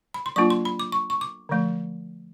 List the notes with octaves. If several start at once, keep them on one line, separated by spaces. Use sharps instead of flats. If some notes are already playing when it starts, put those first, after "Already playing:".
B5
C6
F#3 A#3 D4 F4 C#6
C6
B5
D6
C#6
C#6
D6
D3 F3 A3